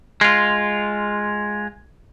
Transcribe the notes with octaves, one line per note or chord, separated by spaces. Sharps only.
G#3 F4